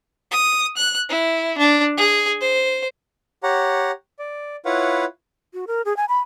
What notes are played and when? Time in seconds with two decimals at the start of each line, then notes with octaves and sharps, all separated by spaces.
0.31 D#6
0.77 F#6
1.10 E4
1.58 D4
1.97 G#4
2.41 C5
3.43 G4 C#5 F#5 A#5
4.19 D5
4.65 E4 F4 B4 C#5 F5 F#5
5.54 F#4
5.67 A#4
5.85 G#4
5.97 G#5
6.09 B5